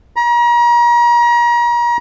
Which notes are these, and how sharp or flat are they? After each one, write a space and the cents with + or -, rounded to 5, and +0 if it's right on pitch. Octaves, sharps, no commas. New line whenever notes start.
A#5 +35